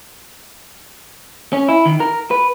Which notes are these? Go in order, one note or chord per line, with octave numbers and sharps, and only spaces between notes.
C#4
E4
D#3
A#4
B4